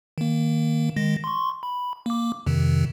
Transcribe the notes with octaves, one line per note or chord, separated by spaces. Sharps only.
D#3 A#3
D#3 G#3 A#6
C6 C#6
B5
A#3 D6
F2 C3 D#3